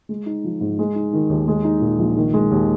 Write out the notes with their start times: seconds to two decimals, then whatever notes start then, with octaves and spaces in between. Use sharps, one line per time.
0.09 G#3
0.26 D#4
0.44 F3
0.61 G#2
0.79 G#3
0.95 D#4
1.13 D#3
1.29 D#2
1.48 G#3
1.64 D#4
1.81 A#2
1.99 A#1
2.16 D#3
2.34 G#3
2.51 D#2